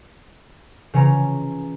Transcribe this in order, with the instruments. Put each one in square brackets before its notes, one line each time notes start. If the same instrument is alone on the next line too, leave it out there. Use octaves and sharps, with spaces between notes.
[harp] C#3 E3 C#4 F4 A#5